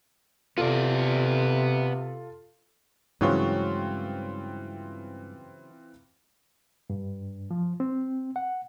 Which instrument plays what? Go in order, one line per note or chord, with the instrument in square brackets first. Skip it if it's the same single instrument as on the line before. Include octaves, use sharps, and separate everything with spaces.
[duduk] C3 [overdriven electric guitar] B3 D5 [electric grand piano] F4 A4
[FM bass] G2 [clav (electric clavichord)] C#3 F#3 C#5 [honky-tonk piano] E3 C4 F4 [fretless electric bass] G#3
[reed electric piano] G2
F3
C4
F#5